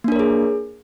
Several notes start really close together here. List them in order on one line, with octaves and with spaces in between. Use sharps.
A#3 D4 A#4 C#5 G#4